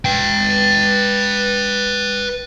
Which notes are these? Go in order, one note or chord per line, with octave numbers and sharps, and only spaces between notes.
B4 G5